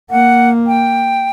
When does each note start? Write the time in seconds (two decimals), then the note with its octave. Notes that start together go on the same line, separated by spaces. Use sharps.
0.10 A#3 F#5
0.67 G5